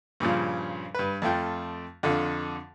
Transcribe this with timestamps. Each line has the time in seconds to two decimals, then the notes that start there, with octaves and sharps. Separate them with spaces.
0.20 G2 A#2 C#3 F3
0.95 G2 B4
1.22 F2 A3 F4 G5
2.03 F2 D3 F4 A4